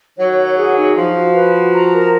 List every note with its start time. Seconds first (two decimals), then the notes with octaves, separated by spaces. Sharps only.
0.19 D#3 F#3 C#5
0.39 F#5
0.58 G#4
0.76 D#4
0.96 F3 F5
1.16 F#4
1.35 B4
1.55 F#4
1.73 A#5
1.93 A#4